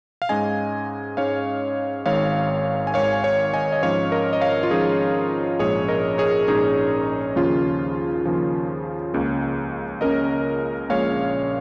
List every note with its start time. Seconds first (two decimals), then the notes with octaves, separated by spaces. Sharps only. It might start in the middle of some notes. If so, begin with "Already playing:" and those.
0.22 F5
0.29 G#2 G#3 C#4 D#5 G#5
1.17 G#2 G#3 C#4 C#5 F5
2.06 G#1 G#2 D#3 C#5 F5
2.87 G#5
2.94 G#1 G#2 D#3 C#5 F5
3.13 G#5
3.24 C#5 F5
3.54 D#5 G#5
3.72 D#5
3.82 G#2 F3 C#4 C#5 F5
4.12 A#4 D#5
4.33 D#5
4.41 C#5 F5
4.63 F4
4.71 G#2 F3 C#4 D#4 G#4
5.59 A#1 G#2 G#3 C#4 G#4 C#5
5.88 A#4 D#5
6.18 G#4 C#5
6.48 A#1 G#2 G#3 C#4 D#4 G#4
7.36 D#2 C#3 F3 C#4 F4
8.25 D#2 C#3 F3 C#4
9.14 C#2 C#3 A#3 C#4
10.01 C#2 C#3 A#3 C#4 A#4 D#5
10.89 A#1 A#2 G#3 C#4 C#5 F5